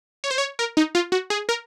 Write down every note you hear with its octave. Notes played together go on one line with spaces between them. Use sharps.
C#5
C5
C#5
A#4
D#4
F4
F#4
G#4
A#4